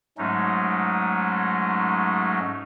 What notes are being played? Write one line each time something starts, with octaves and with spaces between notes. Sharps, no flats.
G#2 F#3 G#3 A3 C#4 D#4